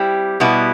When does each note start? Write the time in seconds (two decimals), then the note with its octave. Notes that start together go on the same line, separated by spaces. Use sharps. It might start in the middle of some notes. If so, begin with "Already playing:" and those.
Already playing: G3 C4 E4 G4
0.40 B2 G3 B3 E4